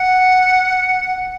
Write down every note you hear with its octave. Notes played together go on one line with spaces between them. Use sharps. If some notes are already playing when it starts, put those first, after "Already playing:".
Already playing: F#5